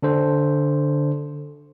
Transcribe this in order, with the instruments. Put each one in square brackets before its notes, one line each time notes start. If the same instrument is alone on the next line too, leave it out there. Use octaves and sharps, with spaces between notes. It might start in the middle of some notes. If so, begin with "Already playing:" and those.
[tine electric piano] D3 D4 A4 C5